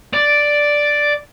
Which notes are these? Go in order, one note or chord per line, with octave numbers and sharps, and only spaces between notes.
D5